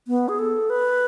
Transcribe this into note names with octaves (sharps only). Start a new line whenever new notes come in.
B3
G#4
A4
B4